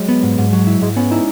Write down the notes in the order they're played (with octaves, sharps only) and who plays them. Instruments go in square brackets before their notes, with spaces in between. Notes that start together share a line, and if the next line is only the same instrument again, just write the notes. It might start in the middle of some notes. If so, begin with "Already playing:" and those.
Already playing: [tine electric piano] F#3 G#3
[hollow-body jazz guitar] B3
G#2
G#2
F#3
E4
[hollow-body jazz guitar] G#2 [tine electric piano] G#3
[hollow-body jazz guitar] B3 [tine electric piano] C#4
[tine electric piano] D#4 [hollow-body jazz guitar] E4